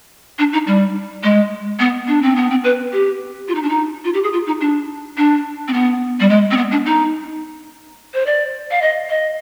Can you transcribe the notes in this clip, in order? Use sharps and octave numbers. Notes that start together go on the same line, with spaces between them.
D4
D#4
G3
G#3
B3
D4
C4
B3
C4
B4
G4
F4
D#4
D4
D#4
F4
G4
G#4
F4
D#4
D4
D4
C4
B3
G3
G#3
C4
B3
D4
D#4
C5
D5
F5
D#5
D#5